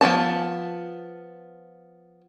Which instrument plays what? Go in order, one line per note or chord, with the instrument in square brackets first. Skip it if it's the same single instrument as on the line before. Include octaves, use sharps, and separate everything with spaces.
[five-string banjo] F3 F#3 B3 A5